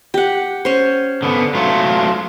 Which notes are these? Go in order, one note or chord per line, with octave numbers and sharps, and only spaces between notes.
G4 F#5
C#4 C5
D3 B3
F#3 A3 F4